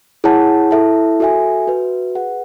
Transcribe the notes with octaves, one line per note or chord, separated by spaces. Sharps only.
E4 G#4 C#5 F#5 A5
E4 A4 E5 A5
F#4 A4 E5 G#5
F#4 B4 E5
G#4 B4 F#5